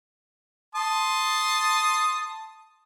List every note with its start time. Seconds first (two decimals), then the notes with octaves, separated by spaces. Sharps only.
0.75 A5 C6 D#6